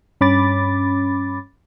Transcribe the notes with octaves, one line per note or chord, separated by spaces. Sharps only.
G2 C#4 B5 D6 A6